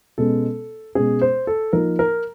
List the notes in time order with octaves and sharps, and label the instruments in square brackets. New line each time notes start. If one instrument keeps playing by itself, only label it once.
[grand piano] B2 G#3 C#4 A4
B2 G#3 C#4 G#4
C5
A4
F3 A#3 D#4 A#4
A#4